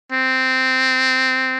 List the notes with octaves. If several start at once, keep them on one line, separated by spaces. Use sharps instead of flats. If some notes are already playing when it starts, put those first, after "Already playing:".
C4